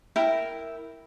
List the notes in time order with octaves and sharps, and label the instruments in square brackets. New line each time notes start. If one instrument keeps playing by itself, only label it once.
[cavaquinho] E4 A#4 G5